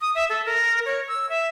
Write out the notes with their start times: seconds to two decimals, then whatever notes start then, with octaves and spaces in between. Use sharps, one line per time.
0.01 D#6
0.15 E5
0.30 A4
0.46 A#4
0.85 C#5
1.08 E6
1.29 E5